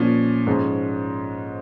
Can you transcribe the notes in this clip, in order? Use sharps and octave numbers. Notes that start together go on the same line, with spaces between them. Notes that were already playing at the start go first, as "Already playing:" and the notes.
Already playing: A#2 F3 C#4
G#2 F3 G#3 C#4